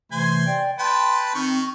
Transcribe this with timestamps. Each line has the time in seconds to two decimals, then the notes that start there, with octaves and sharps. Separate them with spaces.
0.12 C3 E3 A3 C5 G#5 C6
0.47 D5 G5
0.79 B4 G5 A5 C6
1.35 D#3 C4 C#6